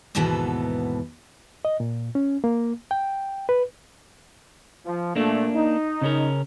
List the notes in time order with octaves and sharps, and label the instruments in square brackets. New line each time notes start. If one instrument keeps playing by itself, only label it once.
[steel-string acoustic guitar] D#2 G#2 B2 E3 B3 A4
[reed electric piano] D#5
A#2
C#4
A#3
G5
B4
[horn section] F3
[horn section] A#2 A3 [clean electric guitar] A#3 D4
[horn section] D#4
[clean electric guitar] C#3 C#4 A#4